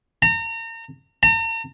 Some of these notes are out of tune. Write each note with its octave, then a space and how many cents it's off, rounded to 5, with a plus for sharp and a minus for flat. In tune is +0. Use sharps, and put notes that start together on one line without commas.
A#5 -35
A#5 -45